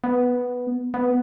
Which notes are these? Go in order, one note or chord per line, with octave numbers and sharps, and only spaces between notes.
B3
B3